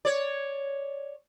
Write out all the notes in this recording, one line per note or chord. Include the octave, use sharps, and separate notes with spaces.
C#5 D5